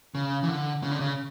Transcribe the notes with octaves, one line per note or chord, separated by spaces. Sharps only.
C#3
E3
D3
C#3
D3
C#3